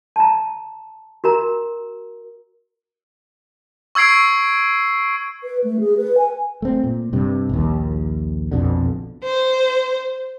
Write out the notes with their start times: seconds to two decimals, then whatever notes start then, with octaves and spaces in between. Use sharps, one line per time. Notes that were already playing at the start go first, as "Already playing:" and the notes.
0.16 A5 A#5
1.24 F#4 A#4 A#5
3.95 C#6 E6 G#6 C7 D7
5.43 B4
5.64 A3
5.80 G#4
5.97 B4
6.18 G#5
6.62 A3 C4
6.84 A#2
7.13 G2 C3
7.49 A#1 D#2
8.52 A#1 F2 B2 D3
9.24 C5